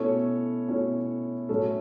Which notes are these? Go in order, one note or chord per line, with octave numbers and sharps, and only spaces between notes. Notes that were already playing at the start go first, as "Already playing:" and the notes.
Already playing: B2 A3 C#4 E4 A4 C#5
B2 A3 C#4 E4
A2 F#3 A3 C#4 A4